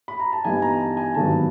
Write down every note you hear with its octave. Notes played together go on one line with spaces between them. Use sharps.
B5
A#5
A5
G2 E3 G3 B3 D#4 G#5
A#5
A5
G#5
G#1 G2 D#3 F#3 B3 A5